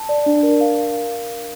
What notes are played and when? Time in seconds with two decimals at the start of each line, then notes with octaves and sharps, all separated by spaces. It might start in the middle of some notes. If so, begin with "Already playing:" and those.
Already playing: A5
0.09 D5
0.26 D4
0.43 A#4
0.61 F5